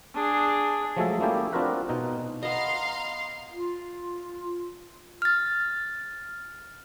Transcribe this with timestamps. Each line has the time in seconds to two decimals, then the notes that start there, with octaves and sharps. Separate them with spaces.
0.14 D4 G#4
0.97 F3 F#3 G#3 A3 G#4 A4
1.21 A#3 C#4 E4 G4 A4
1.53 C4 D4 F4 F#4 A#4 B4
1.89 B2 D#4
2.43 B3 D#5 F5 A#5 C6
3.51 F4
5.22 F6 A6